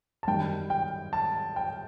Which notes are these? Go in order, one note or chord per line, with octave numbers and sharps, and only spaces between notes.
A5
F#2 D#3 G3 G5
G5
A5
G5